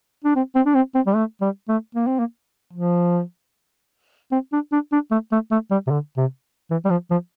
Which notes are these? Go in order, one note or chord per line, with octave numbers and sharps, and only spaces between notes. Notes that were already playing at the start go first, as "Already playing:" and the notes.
D4
C4
C4
D4
C4
C4
G3
A3
G3
A3
A#3
C4
A#3
F3
C4
D4
D4
D4
A3
A3
A3
G3
C3
D3
C3
E3
G3
F3
F3